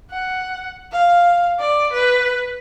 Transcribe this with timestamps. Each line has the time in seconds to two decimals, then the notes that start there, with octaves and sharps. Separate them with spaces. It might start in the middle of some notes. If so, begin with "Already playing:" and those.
0.11 F#5
0.92 F5
1.60 D5
1.92 B4